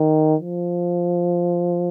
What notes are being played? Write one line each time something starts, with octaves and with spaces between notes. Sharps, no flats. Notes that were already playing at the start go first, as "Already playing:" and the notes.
Already playing: D#3
F3